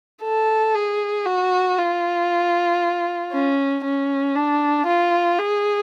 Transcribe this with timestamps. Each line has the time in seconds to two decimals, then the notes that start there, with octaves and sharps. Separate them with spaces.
0.23 A4
0.75 G#4
1.26 F#4
1.78 F4
3.32 C#4
3.84 C#4
4.35 D4
4.87 F4
5.39 G#4